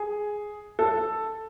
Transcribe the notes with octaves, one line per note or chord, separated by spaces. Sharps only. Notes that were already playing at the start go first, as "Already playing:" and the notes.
Already playing: G#4
A4